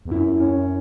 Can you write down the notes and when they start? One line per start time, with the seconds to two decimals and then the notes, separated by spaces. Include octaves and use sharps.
0.05 E2
0.11 F#2 E4
0.40 C#4